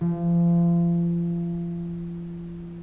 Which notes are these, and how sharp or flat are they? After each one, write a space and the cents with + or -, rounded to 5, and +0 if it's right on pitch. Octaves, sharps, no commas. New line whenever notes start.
F3 -35